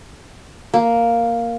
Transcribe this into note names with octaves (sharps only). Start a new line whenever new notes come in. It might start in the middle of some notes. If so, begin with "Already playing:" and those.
A#3